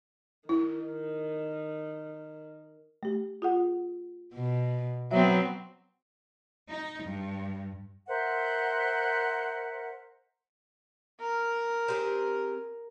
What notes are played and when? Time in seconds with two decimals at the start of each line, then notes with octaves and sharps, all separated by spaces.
0.49 D#3 E4
3.03 A3 G4
3.42 F4 G#4 F#5
4.34 B2
5.11 F#3 B3 C4 E5
6.68 D#4
7.03 G2
8.08 A#4 C5 E5 F#5
11.21 A#4
11.88 C4 G4 G#4